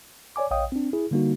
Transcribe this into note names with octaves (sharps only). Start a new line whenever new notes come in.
C#5 D5 G#5 D6
A#1 C#5 D#5 F5 G5 D#6
C4 D4
E4 G#4
D3 G3 A#3 D#4 F#4